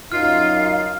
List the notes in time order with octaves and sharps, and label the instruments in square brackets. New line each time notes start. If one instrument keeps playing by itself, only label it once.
[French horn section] F#2 D#4 [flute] F4 [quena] F5 [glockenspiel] F6